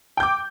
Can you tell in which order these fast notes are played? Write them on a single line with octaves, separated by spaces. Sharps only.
G5 G6 D6